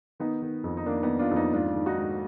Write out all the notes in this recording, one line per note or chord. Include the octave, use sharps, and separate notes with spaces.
D#3 B3 D#4
D#3
F2
D#4
D#3 A#3 D4
B3 D#4
D#3
D4 F4
F2
B3 D#4
G#2 D4 F4
D#3
D#4 F#4
G#2